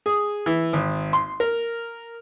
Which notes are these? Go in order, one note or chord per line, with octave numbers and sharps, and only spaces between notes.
G#4
E3
G#1
C6
A#4